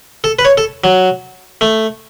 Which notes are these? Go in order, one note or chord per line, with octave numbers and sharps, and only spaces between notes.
A4
B4
C#5
A4
F#3
A3